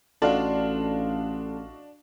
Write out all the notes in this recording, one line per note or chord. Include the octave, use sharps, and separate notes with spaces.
A1 D4 F#4 A4 D#5 F5 A5 C6